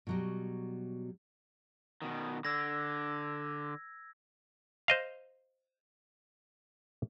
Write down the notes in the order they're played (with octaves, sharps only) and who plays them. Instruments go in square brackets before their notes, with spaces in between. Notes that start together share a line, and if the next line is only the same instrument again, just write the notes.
[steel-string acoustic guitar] B2 F#3 G3
[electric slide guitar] B2 D#3
[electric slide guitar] D3 [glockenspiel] E6 G#6 A#6
[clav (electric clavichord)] C5 D#5 F5